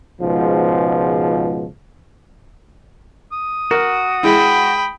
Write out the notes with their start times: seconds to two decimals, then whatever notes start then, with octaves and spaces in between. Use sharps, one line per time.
0.20 C#2 G#2 B2 F3
3.32 D#6
3.71 F#4 A#4
4.23 G#3 E4 G5 B5